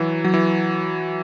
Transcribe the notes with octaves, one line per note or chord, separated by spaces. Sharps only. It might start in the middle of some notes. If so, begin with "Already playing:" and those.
Already playing: E3 F#3
F#3
E3